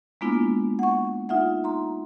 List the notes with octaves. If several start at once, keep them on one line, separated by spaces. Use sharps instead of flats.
G#3 A#3 B3 D4 E4 F4
F#5 C#6
D#4 F4 E5 F#5
A#5 C6